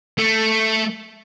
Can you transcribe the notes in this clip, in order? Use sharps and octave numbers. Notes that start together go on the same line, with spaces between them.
A3